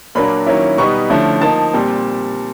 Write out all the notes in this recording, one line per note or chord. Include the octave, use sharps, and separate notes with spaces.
A#2 F#3 A#3 D4 B5
D#3 F#3 A#3 C#4 E4
B2 G3 B3 D#4 C#6
D3 F3 A3 C#4 E4
F3 A#3 D#4 A5
A#2 G3 C4